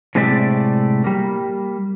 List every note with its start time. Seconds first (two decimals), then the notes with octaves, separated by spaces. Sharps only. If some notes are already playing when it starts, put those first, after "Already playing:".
0.15 A2 C3 G#3 A3 D5 E5
1.04 G3 A#3